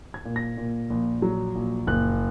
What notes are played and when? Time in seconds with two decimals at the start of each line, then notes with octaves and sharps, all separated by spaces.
0.14 G#6
0.25 A#2
0.36 A#6
0.57 A#2
0.90 A#1
1.22 F#3
1.55 A#1
1.87 F#1 F#6